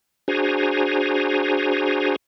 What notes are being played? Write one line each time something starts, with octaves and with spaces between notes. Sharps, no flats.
D4 F#4 G#4 C5 G#5 A#5